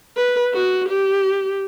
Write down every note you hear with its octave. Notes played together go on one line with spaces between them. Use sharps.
B4
F#4
G4